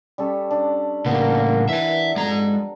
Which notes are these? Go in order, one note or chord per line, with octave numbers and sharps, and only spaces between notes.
G3 C#4 A4
D4
A2 C#3 A#3 B3 A#4
E3 E5 G#5
F2 G#3 A#5